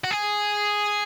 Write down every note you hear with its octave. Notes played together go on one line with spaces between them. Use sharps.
F#4
G#4